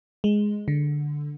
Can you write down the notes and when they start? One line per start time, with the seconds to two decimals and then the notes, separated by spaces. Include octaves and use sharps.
0.24 G#3
0.68 D3